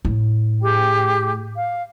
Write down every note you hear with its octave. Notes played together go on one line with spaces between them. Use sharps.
A2
G4 G#4 G5
F5